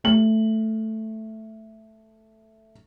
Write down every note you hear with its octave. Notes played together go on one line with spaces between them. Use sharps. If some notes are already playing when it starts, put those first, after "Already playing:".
A3 F#7